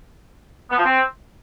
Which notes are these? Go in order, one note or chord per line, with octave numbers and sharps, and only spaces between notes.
B3
F3
C4